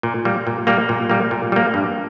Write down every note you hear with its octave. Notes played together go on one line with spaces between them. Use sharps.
A#2
G3 A#3
A#2
G3 A#3
A#2
G3 A#3
A#2
G3 A#3
G2